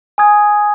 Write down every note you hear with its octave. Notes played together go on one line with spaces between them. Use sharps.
G#5 D#6 G#6